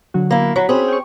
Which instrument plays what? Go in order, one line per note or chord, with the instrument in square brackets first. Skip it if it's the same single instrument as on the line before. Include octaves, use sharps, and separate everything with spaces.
[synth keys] D3 F#3 F#4
[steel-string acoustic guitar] A#3 E4
[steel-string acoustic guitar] F#3 [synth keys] F#4 B5
[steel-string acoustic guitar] C4 C#4 G#4
[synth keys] G5 C#6